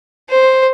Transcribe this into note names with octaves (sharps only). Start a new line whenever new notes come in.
C5